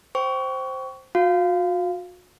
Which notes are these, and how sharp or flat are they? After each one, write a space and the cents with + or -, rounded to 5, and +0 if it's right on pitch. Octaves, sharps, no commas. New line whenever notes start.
C5 +0 G5 -25 C#6 +20
F#4 -40 F5 -5